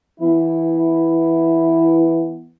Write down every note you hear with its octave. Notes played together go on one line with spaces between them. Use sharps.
E3 B3 E4